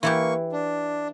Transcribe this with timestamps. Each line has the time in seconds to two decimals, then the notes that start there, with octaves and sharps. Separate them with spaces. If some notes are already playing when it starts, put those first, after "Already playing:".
0.03 E3 A#3 E4 G4 C#6
0.52 D4